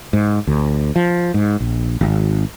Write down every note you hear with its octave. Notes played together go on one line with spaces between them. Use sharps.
G#2
D2
F3
G#2
A#1
G#1